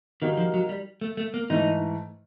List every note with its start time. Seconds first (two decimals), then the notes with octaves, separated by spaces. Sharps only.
0.22 D#3 G3 A#3 D#4 F#4
0.37 F3
0.54 F#3
0.69 G3
1.01 A3
1.17 A3
1.34 A#3
1.50 G#2 E3 A3 D#4